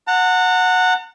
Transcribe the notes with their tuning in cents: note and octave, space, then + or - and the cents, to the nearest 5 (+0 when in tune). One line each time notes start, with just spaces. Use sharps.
F#5 -10 A#5 -45